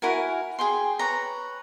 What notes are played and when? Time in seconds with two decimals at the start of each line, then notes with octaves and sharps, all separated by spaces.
0.02 E4 F#4 A#4 G#5
0.59 G#4 G5 C6
0.99 B4 C#5 A#5